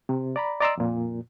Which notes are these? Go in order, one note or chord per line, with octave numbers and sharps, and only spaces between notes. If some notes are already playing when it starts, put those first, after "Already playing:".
C3
D5 A#5 B5
D5 D#5 A#5 C6 D6 E6
F2 A#2